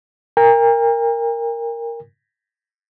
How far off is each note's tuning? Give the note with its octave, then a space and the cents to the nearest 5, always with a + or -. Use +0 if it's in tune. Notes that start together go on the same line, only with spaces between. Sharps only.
A#4 -5 G5 +45